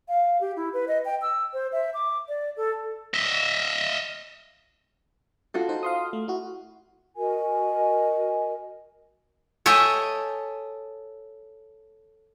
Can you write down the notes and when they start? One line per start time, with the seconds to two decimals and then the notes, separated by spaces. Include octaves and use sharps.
0.08 F5
0.41 G4
0.56 E4
0.73 B4
0.88 D#5
1.05 G5
1.22 E6
1.53 C5
1.72 E5
1.94 D6
2.28 D5
2.57 A4
3.14 D#5 E5
5.54 F4 F#4 A4
5.69 D#4 C5
5.83 F5 C6 D#6
6.13 A3
6.28 E4 F#4
7.18 F#4 A#4 D#5 G#5
9.66 A4 C#5 D#5 E5 G5 G#5